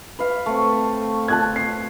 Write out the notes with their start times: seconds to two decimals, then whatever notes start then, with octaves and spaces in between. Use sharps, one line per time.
0.19 B4 F5
0.46 A3 C4
1.28 A5 F#6 G#6
1.56 C7